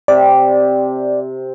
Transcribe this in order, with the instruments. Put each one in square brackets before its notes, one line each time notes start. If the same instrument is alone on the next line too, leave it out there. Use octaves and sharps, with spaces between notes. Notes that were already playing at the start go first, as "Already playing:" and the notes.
[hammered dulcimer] C3 [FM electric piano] D5